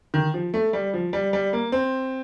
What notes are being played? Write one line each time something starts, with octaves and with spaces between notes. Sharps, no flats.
D#3
F3
A3
G3
F3
G3
G3
A#3
C4